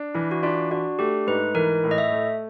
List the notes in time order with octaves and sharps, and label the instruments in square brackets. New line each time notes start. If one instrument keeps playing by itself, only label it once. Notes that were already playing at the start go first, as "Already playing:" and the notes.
Already playing: [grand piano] D4
[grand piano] E3 [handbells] E4
[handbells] F#4
[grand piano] D4 [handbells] F4
[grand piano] D4 [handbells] F#4
[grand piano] A3 [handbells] G4
[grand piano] G#2 [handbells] B4
[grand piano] E3 [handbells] A#4
[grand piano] A2
[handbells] D#5
E5
[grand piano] A3